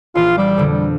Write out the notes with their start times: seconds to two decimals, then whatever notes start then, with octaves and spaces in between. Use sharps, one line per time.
0.15 A#1 E3 F4 F5
0.37 G3 D6 E6 G6
0.57 F2 B2 D3
0.72 G3